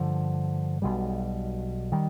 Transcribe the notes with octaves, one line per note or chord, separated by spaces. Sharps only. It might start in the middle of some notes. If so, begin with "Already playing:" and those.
Already playing: G2 D3 F3
B1 B2 G3
D#3 G3